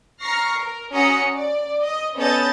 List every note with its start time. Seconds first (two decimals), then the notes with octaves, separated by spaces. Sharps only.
0.20 A#5 C#6 F6 A#6 C7
0.56 A#4
0.93 C#4 F#4 A#5 D#6 A#6 C#7
1.33 D5
1.84 D#5
2.16 B3 C#4 A4 D#5 G6 A6